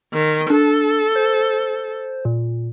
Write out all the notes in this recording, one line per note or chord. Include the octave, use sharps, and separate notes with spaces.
D#3
D4 A4
C5
A#2